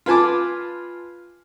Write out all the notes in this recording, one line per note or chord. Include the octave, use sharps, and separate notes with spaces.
F4 B4 G#5 A5 D6